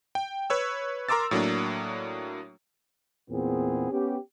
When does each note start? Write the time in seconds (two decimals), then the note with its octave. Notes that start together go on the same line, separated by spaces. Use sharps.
0.15 G5
0.50 B4 C#5 E6
1.09 A#4 A#5 C6 D6 E6 A6
1.31 A2 F#3 A#3 D4
3.30 E2 A#2 B3 C4 G#4
3.91 B3 C#4 G4